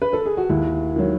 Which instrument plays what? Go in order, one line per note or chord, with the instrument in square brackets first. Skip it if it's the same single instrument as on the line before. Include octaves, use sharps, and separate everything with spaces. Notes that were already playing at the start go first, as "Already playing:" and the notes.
[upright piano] B4
A4
G#4
F#4
D#2 E4
D#3 F#3